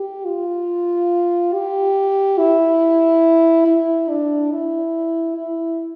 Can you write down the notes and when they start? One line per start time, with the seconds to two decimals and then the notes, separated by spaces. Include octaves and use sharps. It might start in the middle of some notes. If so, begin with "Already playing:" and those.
Already playing: G4
0.26 F4
1.53 G4
2.38 E4
3.67 E4
4.09 D4
4.52 E4
5.37 E4